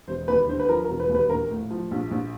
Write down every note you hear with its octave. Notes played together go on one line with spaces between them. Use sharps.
E1 C5
D#2 B4
D3 C5
B4
F3 A#4
A#4
E1
B4
D#2
B4
A#1 A#4
A2
F3
A#1
A#1